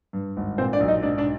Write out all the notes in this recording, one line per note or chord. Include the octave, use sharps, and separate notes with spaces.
G2
G#1
A#2 C4 C5
D4 D5
B1
D#4 D#5
G#2 D4 D5
D4 D5